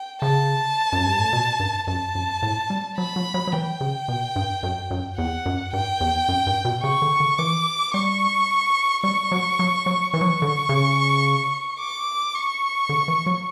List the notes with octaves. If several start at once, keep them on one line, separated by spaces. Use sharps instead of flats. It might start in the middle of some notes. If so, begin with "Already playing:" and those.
Already playing: G5
C#3 A5
F#2
G2
A2
B2
G2
F#2 A5
F#2
A2
G3
F#3 B5
F#3
F#3
F#3
E3 G5
C#3
B2
G2
F#2
F#2
E2 F#5
F#2
G2 G5
E2
F#2
G2
B2
C#3 C#6
D3
D3
E3 D6
G3 C#6
G3 C#6
F#3
F#3
F#3
E3 C#6
F#3
E3
D3
C#3
D6
C#6
D3
E3
F#3